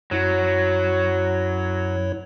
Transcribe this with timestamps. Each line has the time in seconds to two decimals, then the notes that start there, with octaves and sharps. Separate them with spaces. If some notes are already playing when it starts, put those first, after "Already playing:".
0.11 F#2 F#3 E4 C#5